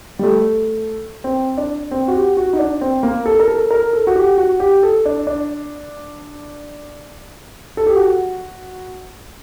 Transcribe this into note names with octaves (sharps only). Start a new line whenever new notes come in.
G3
A3
C4
D4
C4
F#4
G4
F#4
D#4
D4
C4
A#3
A4
A#4
A4
A#4
A4
F#4
G4
F#4
G4
A4
D4
D4
A4
G4
F#4